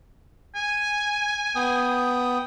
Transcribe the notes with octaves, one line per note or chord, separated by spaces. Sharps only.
G#5
B3 G5 D#6